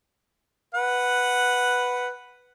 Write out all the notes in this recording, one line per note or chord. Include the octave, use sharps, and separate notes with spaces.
B4 F#5